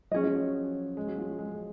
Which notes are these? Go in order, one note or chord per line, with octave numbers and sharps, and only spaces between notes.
F#3 C#4 G#4 D#5
F3
F#3
G#3
F#3
F3
F#3
G#3
G#3